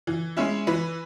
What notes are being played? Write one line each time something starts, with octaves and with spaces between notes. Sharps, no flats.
E3
G#3 C#4 E4
E3 B4